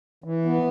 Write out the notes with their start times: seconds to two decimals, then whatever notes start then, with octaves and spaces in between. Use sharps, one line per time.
0.24 E3
0.45 B3